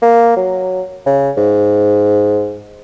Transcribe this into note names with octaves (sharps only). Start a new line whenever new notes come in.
A#3
F#3
C#3
G#2